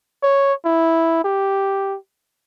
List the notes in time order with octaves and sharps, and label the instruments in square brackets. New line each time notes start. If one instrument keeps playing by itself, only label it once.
[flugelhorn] C#5
E4
G4